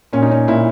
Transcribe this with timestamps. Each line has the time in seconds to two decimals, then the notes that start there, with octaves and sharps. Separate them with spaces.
0.13 A#2 C#4
0.22 D#4
0.31 C#4
0.48 A#2 E4